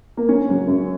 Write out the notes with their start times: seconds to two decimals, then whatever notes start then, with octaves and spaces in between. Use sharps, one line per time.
0.17 A#3
0.29 F#2 C#4
0.48 C#3 F#3
0.67 F#2